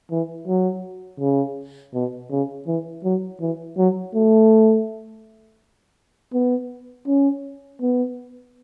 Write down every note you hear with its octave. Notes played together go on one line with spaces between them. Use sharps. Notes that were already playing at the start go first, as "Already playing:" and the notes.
E3
F#3
C#3
B2
C#3
E3
F#3
E3
F#3
A3
B3
C#4
B3